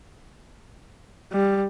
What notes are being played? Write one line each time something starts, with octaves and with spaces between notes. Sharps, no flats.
G3